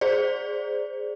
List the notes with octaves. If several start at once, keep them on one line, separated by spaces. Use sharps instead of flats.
G#4 C5 D5